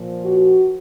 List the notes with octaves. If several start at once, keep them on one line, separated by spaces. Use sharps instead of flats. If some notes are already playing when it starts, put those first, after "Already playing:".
Already playing: A#2 F3
F#4